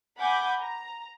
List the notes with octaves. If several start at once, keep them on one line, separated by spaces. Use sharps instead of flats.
F#5 G#5 B5 D6 G6
A#5